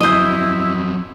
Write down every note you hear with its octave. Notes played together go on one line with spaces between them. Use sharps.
F2 F#3 E4 C5 D#5 D#6 G6